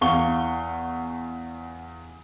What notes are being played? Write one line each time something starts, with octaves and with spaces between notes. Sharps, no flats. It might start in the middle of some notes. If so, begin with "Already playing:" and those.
E2 F5 F#5 C#6 G7